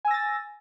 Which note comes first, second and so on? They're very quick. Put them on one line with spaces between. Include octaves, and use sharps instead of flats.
G#5 E6 A#6 A6